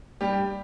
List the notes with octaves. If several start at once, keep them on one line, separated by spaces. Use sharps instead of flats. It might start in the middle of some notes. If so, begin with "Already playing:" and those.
G2 G3 G4